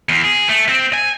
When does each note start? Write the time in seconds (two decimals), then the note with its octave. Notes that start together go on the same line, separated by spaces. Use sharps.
0.09 E2
0.24 G#4
0.49 A3
0.69 C4
0.93 G#5